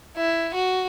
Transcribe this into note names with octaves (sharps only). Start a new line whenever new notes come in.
E4
F#4